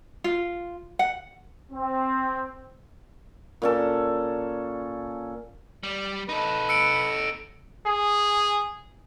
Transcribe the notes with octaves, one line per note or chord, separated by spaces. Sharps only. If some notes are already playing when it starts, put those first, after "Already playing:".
F4
F#5
C4
A#2 C#4 A4
G3
D#4 A4 B4
E6 C#7 D7
G#4